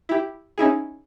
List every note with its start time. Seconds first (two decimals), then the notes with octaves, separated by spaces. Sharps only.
0.09 E4 G4
0.58 C#4 D#4 E4 G#4